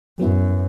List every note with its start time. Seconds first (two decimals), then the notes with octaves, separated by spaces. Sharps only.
0.20 F#2 F#3 B3 E4